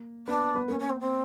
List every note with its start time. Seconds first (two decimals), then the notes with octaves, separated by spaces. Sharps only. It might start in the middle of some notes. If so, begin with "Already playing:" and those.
Already playing: A#3
0.27 B3 D4 B4
0.55 B3 B4
0.68 A#3 C#4 A#4
0.79 C#4
0.89 C4
1.00 C4